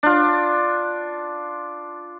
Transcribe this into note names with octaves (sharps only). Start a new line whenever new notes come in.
D4 F4